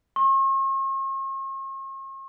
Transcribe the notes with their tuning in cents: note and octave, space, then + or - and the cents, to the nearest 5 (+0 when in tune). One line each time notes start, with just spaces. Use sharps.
C#6 -45